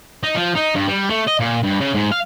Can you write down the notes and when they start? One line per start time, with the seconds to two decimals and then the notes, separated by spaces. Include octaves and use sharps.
0.23 D#4
0.36 F3
0.56 D#4
0.76 G2
0.88 G3
1.10 A3
1.28 D#5
1.40 A#2
1.64 G2
1.80 C#3
1.94 G#2
2.12 F5